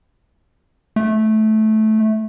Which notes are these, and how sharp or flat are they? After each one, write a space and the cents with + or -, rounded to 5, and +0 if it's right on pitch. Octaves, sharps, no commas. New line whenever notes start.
A3 -15